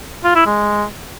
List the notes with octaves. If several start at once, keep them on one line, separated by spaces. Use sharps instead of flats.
F4
E4
G#3